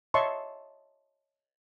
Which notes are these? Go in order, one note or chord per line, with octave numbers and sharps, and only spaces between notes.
C#5 D#5 E5 A5 C6 C#6